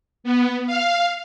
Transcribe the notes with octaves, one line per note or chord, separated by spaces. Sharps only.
B3
F5